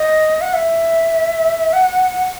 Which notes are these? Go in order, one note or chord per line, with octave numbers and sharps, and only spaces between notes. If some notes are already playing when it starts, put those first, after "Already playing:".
Already playing: D#5
F#5
E5
F#5